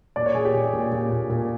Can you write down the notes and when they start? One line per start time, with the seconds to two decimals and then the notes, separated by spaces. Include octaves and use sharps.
0.16 A#2 D5
0.26 C#5
0.35 A#2 G#4
0.45 G4
0.55 A#2
0.73 A#2
0.92 A#2
1.11 A#2
1.29 A#2